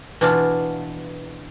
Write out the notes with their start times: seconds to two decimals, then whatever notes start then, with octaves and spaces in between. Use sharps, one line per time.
0.21 B2 E3 D4 F4